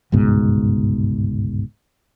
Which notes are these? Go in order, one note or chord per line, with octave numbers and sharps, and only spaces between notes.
G1 C#2 G#2 B2